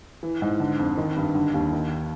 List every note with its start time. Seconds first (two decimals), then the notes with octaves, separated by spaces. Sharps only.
0.23 E3
0.42 G#2
0.60 D3
0.79 F2
0.98 D#3
1.16 G2
1.35 D3
1.54 D#2
1.72 D#3